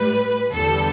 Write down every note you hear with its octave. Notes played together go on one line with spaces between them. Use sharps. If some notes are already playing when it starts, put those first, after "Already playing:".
Already playing: A2 G3 B4
E2 D3 G3 A4